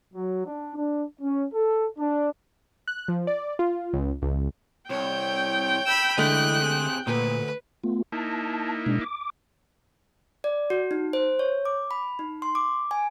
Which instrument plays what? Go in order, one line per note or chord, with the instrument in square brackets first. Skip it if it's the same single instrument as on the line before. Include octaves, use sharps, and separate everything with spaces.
[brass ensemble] F#3
D4
D4
C#4
A4
D4
[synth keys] F#6
F3
D5
F4
C#2
C#2
[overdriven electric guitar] C2 [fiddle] C#5 [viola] G5
[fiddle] B5 E6
[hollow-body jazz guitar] D3 G#3 A3 [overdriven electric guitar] E3 D#5 [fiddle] F#6
[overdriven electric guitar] C3 G#4
[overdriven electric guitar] D2 [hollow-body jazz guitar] A#2 [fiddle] B4
[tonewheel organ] A3 B3 F4
[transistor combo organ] A#3 D#4 E4 [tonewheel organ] A5
[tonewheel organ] B2 G#3 D4
D6
[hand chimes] D5
F#4
D#4
C5
C#5
D6
B5
D#4
C6
D6
G#5